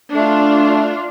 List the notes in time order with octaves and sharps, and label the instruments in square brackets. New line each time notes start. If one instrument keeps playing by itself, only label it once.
[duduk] A3 [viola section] D4 F4